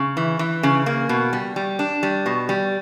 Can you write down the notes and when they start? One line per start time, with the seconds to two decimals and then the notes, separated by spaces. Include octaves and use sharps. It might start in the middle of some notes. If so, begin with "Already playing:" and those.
Already playing: C#3
0.17 E3
0.39 E3
0.63 C#3
0.86 A#3
1.09 B2
1.33 G3
1.56 G3
1.79 D4
2.03 G3
2.26 B2
2.49 G3